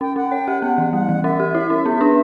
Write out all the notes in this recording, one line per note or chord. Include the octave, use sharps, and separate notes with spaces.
C#4 G5
C#4 F#5
C#5 G5
G4 F#5
B3 F#5
E3
G3 F#5
E3
C#4 E5
G4
E4
C#4
B3
D4